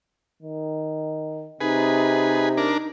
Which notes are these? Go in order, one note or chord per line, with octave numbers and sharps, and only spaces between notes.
D#3
C3 D#4 G#4 B4
D4 A#4